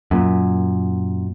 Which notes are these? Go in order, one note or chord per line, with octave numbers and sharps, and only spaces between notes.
F#2 A#2